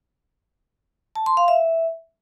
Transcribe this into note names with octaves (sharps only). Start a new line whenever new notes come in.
A5
C6
F5
E5